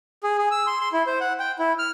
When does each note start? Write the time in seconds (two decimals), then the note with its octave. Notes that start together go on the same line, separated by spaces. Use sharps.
0.23 G#4
0.38 G#4
0.51 E6
0.67 C6
0.81 C6
0.93 E4
1.07 C5
1.21 F#5
1.40 G5
1.59 E4
1.79 F6